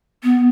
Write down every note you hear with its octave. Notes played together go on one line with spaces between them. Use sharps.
B3